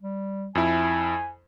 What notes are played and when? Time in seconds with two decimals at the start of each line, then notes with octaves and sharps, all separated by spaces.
0.02 G3
0.55 F2 E4 G#5